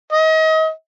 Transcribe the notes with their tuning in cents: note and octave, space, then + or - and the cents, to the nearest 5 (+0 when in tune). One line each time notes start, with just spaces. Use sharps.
D#5 +35